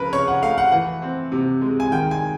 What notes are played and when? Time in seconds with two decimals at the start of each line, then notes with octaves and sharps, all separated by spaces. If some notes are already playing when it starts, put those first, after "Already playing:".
Already playing: C#3 F3 A#4 B4
0.13 C#3 C#5
0.28 F#5
0.42 A3 F5
0.58 F#5
0.72 E3 F#5
1.02 C4
1.32 C3
1.61 G#3
1.80 G#5
1.92 D#3 G5
2.11 G#5